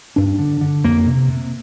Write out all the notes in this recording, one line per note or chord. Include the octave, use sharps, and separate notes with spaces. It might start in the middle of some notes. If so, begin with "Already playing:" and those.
G2 D4
D3
D3
F2 A#3
C3
C3